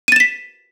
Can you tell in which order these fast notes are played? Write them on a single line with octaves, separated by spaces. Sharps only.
D#7 A6 E7 B6